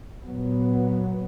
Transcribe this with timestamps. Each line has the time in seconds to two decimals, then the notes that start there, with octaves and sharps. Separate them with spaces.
0.23 A#2 F#3 B3